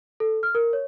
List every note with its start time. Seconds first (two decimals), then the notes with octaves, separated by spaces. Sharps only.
0.20 A4
0.43 F6
0.55 A#4
0.73 C#5